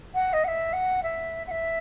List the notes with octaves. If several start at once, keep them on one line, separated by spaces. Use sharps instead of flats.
F#5
D#5
F#5
E5
F#5
E5
F#5
E5